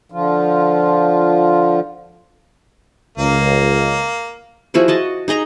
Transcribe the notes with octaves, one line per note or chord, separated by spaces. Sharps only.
D3 F3 F4
C#2 A#3
F3 E4 F#4 G#4
F#4 D#5 A5
D#4 G#4 D#5 A#5